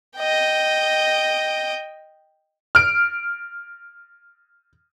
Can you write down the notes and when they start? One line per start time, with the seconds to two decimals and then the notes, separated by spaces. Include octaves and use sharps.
0.17 D#5 G5
2.75 F6 D7